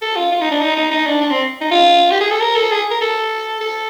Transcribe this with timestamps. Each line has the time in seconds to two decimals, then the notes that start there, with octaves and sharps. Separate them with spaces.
0.02 A4
0.16 F4
0.32 F4
0.41 D#4
0.51 D4
0.61 D#4
0.76 D#4
0.91 D#4
1.06 D4
1.21 D4
1.31 C4
1.61 D#4
1.71 F4
2.11 G4
2.21 G#4
2.31 A4
2.41 A#4
2.56 A4
2.71 G#4
2.91 A#4
3.01 A4
3.61 A4